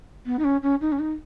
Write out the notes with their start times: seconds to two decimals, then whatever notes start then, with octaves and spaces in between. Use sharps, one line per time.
0.26 B3
0.39 D#4
0.44 C#4
0.63 C#4
0.81 D#4
0.92 C#4
0.99 D#4